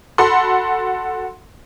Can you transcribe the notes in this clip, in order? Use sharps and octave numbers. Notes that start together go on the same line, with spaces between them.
F#4 A4 B5 C6